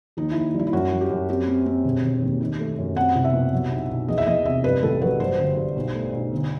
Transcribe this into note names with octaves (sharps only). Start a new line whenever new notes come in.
D#2 D#4
D#2 E4
G3 E4
E4
F#2 F#4
F#3
G4
F#2
C4 G4
C4
C4
E1
E1
D#2
D#3
A3
F#2
C4 F#5
C2
E5
B2
F#3
B1
B1
E2 D#5
E5
E2 D#5
C3 E5
G2 B4
A1 A4
F#3 B4
G2 C5
G1
G2
B1
A3
B1
G1